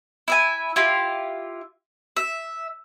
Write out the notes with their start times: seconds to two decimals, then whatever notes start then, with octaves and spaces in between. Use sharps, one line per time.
0.28 E4 E5 G#5
0.76 E4 F4 G4
2.16 E5